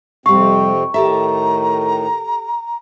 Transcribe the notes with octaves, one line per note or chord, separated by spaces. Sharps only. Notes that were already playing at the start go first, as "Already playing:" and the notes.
F2 C3 G3 C4 F5 C#6
A2 D#3 G4 A4 E5 A#5